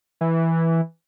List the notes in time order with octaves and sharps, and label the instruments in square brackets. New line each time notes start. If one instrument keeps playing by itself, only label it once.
[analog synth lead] E3